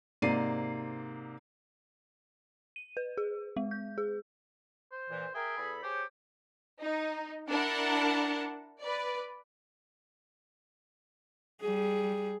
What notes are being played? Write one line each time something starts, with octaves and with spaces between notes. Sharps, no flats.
G#2 C3 A#3 D5 C7 D#7
D#7
B4
G#4
G#3
G6
G#4
C5
A#2 E3
G#4 A#4 E5 G5
E2 A4 B5
G4 G#4 C5 C#5
D#4
D4 E4 A#4 F#5 A5
B4 D5
G3 G#4